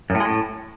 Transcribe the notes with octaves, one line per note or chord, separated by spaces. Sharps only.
F#2
A2
G#3
A2